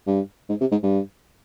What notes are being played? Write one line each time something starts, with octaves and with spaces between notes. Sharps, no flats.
G2
G#2
C3
G#2
G2